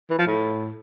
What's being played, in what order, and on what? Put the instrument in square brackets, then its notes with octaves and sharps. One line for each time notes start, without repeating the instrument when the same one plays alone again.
[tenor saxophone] E3
F3
A2